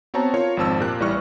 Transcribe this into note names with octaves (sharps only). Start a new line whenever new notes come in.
B3 C4 F#4 C#5 A5 A#5
F4 A#4 C#5
G#1 F2 C4 A5 E6
A#2 G4 A#4 F#6
A1 G3 E4 B4 C#6 F6